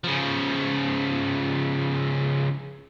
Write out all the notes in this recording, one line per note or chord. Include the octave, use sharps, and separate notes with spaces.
C#3 F3